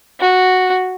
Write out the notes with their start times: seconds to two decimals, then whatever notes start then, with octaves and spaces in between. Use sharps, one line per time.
0.20 F#4